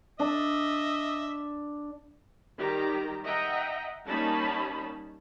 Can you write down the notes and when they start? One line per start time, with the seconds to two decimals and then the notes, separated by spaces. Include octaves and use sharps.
0.20 D4 D#5 E5
2.58 D#3 G3 G4 A#5
3.25 D#5 E5 F#5 G5 A#5
4.05 G3 A#3 C#4 D#4 A5 B5